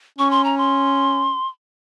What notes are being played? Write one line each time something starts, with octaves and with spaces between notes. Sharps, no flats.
C#4 C#6
C6
A#5
C6